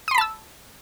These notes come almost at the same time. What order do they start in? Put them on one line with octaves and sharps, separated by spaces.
D#6 C6 B5 A5 E6